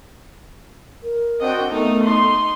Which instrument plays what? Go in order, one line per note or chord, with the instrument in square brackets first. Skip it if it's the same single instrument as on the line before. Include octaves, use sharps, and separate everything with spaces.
[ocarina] A#4
[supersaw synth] C4 D4 F#4 [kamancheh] D#5 G5
[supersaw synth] A3 [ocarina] B3 [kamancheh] D#4 A#4
[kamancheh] D#4 C6